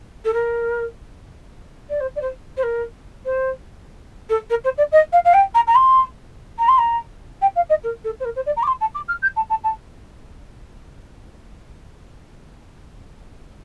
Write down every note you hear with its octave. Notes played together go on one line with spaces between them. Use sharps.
A4
A#4
D5
C5
D5
C5
C5
A#4
C5
A4
A#4
C5
D5
D#5
F5
F5
G5
A#5
A#5
C6
A#5
C6
A#5
G5
F5
D#5
A#4
A4
C5
A#4
C5
D5
A#5
D6
C6
A5
D6
F6
G6
A5
A5
A5